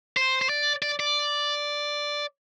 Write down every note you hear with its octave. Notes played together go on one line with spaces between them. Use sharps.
C5
C5
D5
D5
D5